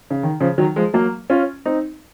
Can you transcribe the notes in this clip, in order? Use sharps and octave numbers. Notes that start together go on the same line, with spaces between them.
C#3
D#3
C#3 F3
D#3 F#3
F3 G#3
F#3 A#3
C#4 F4
C4 D#4